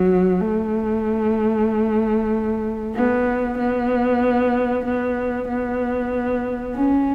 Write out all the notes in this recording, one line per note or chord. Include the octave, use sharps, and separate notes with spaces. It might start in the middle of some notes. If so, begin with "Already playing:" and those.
Already playing: F#3
A3
B3
B3
B3
B3
C#4